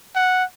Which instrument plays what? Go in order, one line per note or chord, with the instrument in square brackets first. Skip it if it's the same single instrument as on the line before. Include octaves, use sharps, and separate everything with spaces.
[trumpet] F#5